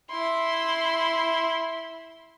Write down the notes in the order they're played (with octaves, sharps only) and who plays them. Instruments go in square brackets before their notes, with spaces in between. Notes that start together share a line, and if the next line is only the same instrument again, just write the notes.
[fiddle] E4 C6